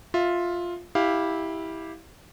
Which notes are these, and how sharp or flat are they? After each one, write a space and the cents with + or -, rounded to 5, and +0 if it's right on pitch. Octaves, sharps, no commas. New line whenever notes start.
F4 +5 E5 -5
E4 -15 G4 +0 F5 +0